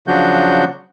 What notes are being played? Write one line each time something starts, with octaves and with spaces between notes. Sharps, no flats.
C#3 F3 F#3 D4 F#4 G6